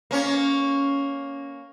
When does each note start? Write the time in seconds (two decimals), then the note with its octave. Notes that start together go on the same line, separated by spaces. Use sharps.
0.11 A#3 C#4 C#5